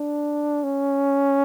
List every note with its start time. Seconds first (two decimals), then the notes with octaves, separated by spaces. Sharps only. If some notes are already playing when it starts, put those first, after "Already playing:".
Already playing: D4
0.64 C#4